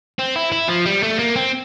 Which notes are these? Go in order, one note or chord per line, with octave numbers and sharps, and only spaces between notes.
C4
E4
E4
F3
G3
A3
A#3
C4